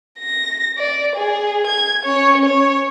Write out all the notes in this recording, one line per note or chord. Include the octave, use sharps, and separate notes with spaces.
A#6
D5
G#4
G#6
C#4 C#5
C#5